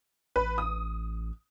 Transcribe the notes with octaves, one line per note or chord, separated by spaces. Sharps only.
A1 B4
D#6